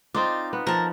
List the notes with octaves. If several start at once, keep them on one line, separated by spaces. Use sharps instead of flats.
C4 D#4 F4 D5
B3
F3 A#4 A5